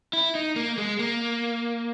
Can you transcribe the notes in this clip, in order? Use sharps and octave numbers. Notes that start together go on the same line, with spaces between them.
E4
D#4
A#3
G#3
A#3